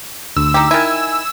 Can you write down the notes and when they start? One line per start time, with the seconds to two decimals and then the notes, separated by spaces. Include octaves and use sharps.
0.37 D2 E6
0.54 D#4 G4
0.71 D#3 E4 G#5